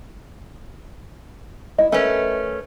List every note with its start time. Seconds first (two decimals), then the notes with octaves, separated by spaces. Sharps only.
1.79 E4 D#5
1.92 A3 C#4 A#4 B4 G#5